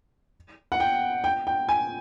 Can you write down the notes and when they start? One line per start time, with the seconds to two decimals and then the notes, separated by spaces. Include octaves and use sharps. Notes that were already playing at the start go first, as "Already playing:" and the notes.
0.72 F#5
0.80 G5
1.24 G5
1.47 G5
1.69 G#5